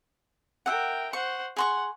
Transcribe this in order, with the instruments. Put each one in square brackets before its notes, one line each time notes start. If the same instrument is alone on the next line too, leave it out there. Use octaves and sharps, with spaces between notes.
[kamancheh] A#4 G5 [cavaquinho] E5 F#5
[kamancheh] C5 F#5 [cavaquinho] C#6
[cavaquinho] G#4 C6 C#6 [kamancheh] F#5